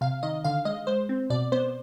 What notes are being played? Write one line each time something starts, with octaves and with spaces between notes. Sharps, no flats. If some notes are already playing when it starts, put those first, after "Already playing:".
C3 F5
D#3 D#5
D3 F5
G#3 D#5
G#3 C5
C4
B2 D5
B3 C5